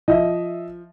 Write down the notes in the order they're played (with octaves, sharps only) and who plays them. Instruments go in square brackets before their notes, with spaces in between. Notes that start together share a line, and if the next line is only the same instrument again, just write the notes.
[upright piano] F3 [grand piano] D#5 E5